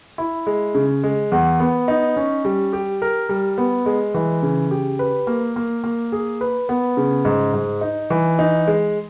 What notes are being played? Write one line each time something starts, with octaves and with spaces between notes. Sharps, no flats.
E4
G#3
C#3
G#3
E2
B3
D#4
C#4
G3
G4
A#4
G3
B3
G#3
E3
C#3
G4
B4
A#3
A#3
A#3
G#4
B4
B3
C#3
G#2
G#2
D#4
E3
D#4
G#3